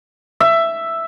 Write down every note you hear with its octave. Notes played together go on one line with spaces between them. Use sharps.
E5